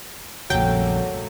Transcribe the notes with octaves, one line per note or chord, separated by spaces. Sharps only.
A#1 F2 C#3 F#3 G3 A3 A#3 G5